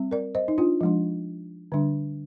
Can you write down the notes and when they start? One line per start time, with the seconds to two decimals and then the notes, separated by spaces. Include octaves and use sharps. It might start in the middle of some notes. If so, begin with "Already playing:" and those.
Already playing: G3 C4
0.11 A#4 D5
0.35 C5 D#5
0.48 D#4
0.58 D4 F4
0.81 F3 G#3 D4
1.72 D3 G3 D4